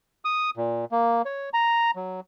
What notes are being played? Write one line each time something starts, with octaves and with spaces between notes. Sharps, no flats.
D#6
A#2
A#3
C#5
A#5
F#3